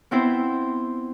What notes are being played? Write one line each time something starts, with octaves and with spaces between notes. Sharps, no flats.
B3 C4 E4 C5